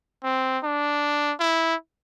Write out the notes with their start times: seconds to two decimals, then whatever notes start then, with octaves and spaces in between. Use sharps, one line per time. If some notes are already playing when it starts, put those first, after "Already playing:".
0.24 C4
0.63 D4
1.40 E4